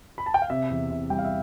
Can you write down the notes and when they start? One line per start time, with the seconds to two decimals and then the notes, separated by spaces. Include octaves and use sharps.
0.18 B5
0.26 A5
0.34 G5
0.42 F5
0.50 C3 E5
0.70 E2
0.91 C3
1.10 G3 G5
1.19 F5
1.25 E5